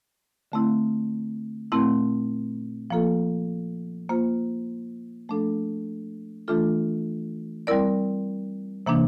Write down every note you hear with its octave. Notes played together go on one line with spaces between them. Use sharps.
D3 A3 C4 E4
A#2 A3 C4 E4
F3 A#3 F4 A4
A#3 F4 C5
F3 A3 D4 A4
E3 A3 D4 F4 A4
G3 C4 E4 A#4 D5
C3 E3 A#3 D4